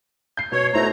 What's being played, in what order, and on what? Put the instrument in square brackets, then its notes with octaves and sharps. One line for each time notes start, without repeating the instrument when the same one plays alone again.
[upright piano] G6 C7
[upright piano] B2 [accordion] C#5
[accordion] B2 A3 A#5 [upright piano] E4 C5